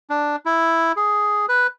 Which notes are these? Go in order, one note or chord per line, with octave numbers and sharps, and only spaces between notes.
D4
E4
G#4
B4